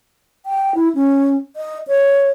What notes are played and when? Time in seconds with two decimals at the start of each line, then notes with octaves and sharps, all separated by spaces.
0.46 G5
0.75 E4
0.95 C#4
1.56 D#5
1.88 C#5